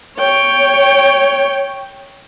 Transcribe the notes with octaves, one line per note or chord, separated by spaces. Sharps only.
C#5 G5